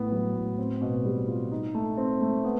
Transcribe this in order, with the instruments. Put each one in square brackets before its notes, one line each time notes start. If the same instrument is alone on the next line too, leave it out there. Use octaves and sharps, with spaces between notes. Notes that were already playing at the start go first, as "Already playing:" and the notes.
Already playing: [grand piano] A2 B3
F#3
A2
C4
B2
G3
F4
D#4
A3
C4
A3
B3